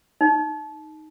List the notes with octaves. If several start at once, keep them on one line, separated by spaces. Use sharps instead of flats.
D#4